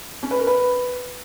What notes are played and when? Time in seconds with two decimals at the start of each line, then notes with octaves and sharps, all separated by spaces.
0.23 C#4
0.31 B4
0.39 A#4
0.47 B4